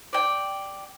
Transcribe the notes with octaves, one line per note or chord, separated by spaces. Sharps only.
D5 G5